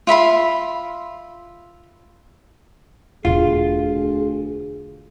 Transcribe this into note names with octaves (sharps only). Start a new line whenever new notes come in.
F4 E5 B5 C6
E1 D2 B2 F4 G#4